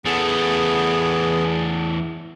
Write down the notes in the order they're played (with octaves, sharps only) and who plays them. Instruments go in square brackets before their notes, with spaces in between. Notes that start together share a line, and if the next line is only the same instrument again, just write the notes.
[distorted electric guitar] E2 A3 [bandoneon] B3 G#4